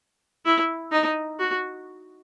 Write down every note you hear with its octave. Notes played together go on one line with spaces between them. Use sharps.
E4
D#4
F#4